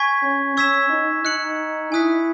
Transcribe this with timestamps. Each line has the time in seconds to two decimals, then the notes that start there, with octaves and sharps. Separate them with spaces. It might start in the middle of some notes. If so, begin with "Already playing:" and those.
Already playing: G#5 C#6 G#6 B6
0.23 C#4
0.57 C#4 C#6 E6 G#6 B6 E7
0.90 D#4
1.24 D#4 F#6 C#7 F#7
1.92 E4 G#5 D#6 F#6 B6